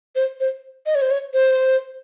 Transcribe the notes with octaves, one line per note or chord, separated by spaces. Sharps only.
C5
C5
D#5
C#5
C5
C#5
C5